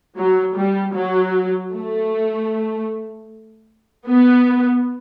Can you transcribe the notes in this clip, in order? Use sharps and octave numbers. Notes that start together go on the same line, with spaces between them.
F#3
G3
F#3
A3
B3